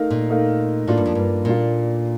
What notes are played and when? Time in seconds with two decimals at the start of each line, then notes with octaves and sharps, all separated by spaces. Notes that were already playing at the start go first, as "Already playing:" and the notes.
Already playing: A3 D#4 A#4 F5
0.10 A#2
0.30 A3 D#4 A#4 F5
0.87 A2 A#3 D4 F4
0.97 G2
1.06 F2
1.15 G2
1.45 A#2 A#3 D4 F4